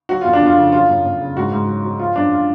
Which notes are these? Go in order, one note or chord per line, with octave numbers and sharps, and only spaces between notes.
F#3 F#4
F2 F4
D4
F2 F4
C#3
F#3 F4
F#2
F#2
C#3
G#2 F#4
G#2
F#3
F#3
F3 F4
F#2 D4
F4